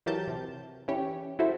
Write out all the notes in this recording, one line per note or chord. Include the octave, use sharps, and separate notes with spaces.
E3 F#3 G4 A#4 A5 G6
C3
E3 C#4 G4 C#5
E4 F#4 A4 C5 E5